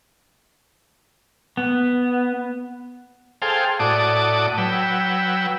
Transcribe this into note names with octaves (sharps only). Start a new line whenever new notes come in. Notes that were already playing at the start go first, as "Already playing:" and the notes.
B3
G#4 A4 C5 F5 G5
A2 F#4 D5 A5 D6 D#6
F#3 B4 G5 E6